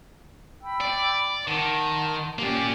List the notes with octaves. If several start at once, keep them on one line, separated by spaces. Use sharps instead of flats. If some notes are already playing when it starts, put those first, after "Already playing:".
G5 B5 E6
D5
D#3 F#5 A5 C6
A#3 C#4 G4 D5 G#5